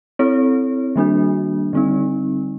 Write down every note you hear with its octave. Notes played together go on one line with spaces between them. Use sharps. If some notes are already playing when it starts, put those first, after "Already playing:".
C4 E4 A4 C#5
D#3 G3 A#3 D4 F#4
D3 G3 C4 D#4